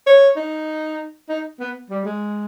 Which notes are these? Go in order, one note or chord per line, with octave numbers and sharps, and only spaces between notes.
C#5
D#4
D#4
B3
G3
G#3